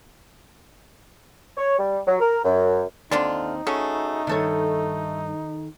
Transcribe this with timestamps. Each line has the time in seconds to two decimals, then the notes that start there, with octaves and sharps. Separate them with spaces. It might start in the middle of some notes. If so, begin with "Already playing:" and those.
1.57 C#5
1.78 G3
2.07 F#3
2.20 A#4
2.44 F#2
3.11 D#2 D3 C4 D4 D#4 F4
3.67 A3 C#4 F#4 G#4 A4
4.27 E2 G2 D#3 A4 C#5